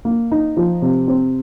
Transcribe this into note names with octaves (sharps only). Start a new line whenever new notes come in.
A#3
D#4
F3
C3
C4